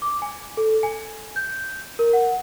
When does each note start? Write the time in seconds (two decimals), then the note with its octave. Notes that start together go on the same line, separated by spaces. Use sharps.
0.02 D6
0.22 G#5
0.57 A4
0.83 G#5
1.36 G6
1.99 A#4
2.13 F#5